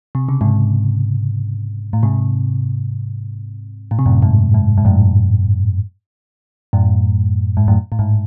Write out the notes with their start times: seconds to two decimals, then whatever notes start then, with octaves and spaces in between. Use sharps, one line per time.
0.15 C3
0.29 C#3
0.41 G#2 C3
1.93 A2
2.03 G#2 C3
3.91 A2
3.99 C3
4.06 F#2 A2
4.22 G#2
4.54 G#2
4.78 G#2
4.85 F#2 A2
6.73 F#2 A2
7.57 G#2
7.68 F#2 A2
7.92 A2
7.99 G#2